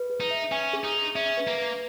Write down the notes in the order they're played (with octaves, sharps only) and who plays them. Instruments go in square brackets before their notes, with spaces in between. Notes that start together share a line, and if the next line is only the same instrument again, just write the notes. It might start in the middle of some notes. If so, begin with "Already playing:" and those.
Already playing: [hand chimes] B4
G#4
[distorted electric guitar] D#4
[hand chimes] E5
[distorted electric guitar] C#4 [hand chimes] G#5
[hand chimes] G#4
[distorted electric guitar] D#4
[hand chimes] G#4
[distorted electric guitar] C#4 [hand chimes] E5
[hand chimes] B4
[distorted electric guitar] A#3
[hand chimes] B4